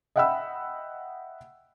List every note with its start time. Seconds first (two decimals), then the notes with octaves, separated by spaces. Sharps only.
0.16 D#5 E5 F#5 G5 B5 E6